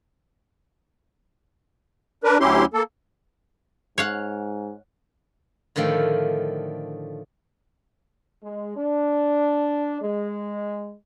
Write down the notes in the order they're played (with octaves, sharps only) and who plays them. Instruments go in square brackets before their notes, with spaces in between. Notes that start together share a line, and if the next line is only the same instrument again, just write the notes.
[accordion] D4 A#4 B4
D2 F#3 C#4 E4 G4 C6
A#3 A4
[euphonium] G#2 [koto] C#5 F5 F#5
[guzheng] A2 D3 D#3 F3 A3
[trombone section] G#3
D4
G#3